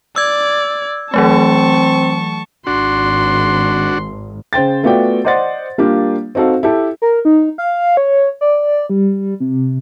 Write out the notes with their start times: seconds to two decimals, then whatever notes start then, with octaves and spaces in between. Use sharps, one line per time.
0.16 D5 E6 G#6
1.14 E3 F#3 A3 C4 A5 C#6
2.67 G#1 D4 F#4 C6
4.53 C#3 C5 G5 A6
4.83 A3 B3 F4 F#4 D5 G5
5.25 C5 D5 D#5 F#5 C6 A6
5.78 G3 A#3 D4 F4 G4
6.35 C4 D#4 F#4 A4 F5
6.63 E4 G4 A4
7.02 A#4
7.25 D#4
7.58 F5
7.97 C#5
8.41 D5
8.90 G3
9.40 C3